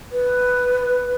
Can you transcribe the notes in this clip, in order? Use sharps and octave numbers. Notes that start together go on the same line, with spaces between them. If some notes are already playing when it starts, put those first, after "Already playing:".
B4